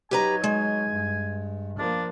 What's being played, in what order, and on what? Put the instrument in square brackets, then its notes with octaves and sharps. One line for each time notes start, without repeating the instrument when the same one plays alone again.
[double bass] F#3 D#4 [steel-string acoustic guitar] G4 B4 A#5 [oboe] G#5
[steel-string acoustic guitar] G#3
[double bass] G2
[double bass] F3 A#3 [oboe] D4